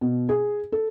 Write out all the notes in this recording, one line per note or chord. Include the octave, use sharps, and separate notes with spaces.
B2
G#4
A4